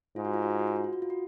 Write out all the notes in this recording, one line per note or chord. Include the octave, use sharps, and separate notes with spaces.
G#2 F4
F#4
F4
F#4
F4
F#4
F4
F#4
F4
F#4
F4
F#4